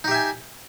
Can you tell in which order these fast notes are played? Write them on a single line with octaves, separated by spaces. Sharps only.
D#4 G4 E5 G#5